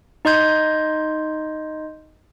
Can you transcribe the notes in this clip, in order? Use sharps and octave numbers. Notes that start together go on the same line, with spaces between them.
D#4 D#5 C6 G6 G#6